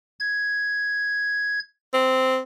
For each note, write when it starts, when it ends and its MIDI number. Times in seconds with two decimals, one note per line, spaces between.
0.20 1.60 92
1.93 2.39 60